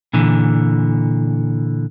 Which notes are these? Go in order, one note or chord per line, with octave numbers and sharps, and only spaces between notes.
A#2 D3 E3